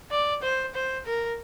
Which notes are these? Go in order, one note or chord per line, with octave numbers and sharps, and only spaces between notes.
D5
C5
C5
A#4